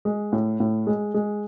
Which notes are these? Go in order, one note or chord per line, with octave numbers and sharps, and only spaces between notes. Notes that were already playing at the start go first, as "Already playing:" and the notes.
G#3
A2
A2
G#3
G#3